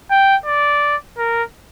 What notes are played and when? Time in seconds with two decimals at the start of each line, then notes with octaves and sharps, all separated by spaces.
0.11 G5
0.46 D5
1.18 A#4